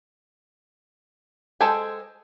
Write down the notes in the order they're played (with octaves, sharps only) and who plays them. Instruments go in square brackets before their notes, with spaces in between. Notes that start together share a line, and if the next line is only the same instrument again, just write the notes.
[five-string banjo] G#3 A4 C5 G5 G#5